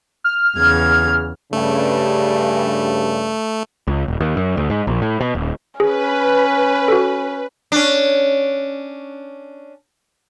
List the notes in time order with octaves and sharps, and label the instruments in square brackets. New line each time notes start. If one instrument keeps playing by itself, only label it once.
[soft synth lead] F6
[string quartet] E2 C#3 G#6
[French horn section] G2 C#3 [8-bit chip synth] A3
[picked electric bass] C#2
D#1
D#2
F#2
D2
G#2
A#1
A2
B2
D#1
[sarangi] C#4 [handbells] G#4 [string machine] B4
[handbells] F#4 A4
[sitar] C#4 D4